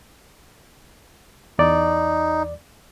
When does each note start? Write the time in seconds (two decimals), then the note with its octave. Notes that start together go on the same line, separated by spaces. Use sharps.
1.59 E2 D#4 D5